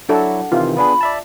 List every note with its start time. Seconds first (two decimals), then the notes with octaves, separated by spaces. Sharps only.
0.09 F#3 D4 E4 F#4 A4 F#5
0.52 C3 D#3 E3 F4
0.77 B3 D4 G#4 B5
1.01 D5 E5 A5